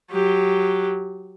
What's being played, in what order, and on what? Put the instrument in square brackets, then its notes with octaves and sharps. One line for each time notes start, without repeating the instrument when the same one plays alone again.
[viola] F#3 G4